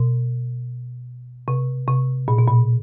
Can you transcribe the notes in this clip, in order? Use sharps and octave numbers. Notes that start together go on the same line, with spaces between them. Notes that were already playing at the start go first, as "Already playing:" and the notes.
Already playing: B2
C3
C3
A#2
B2
A#2